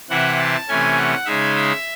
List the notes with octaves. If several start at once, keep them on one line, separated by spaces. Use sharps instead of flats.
C3 E3 C4 E4 F#5
A5
C3 E3 A3 C#4 G#5
F#5
C#3 G#3 D#4 E5
E5